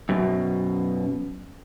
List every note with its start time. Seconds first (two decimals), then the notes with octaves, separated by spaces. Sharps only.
0.09 F#2 B2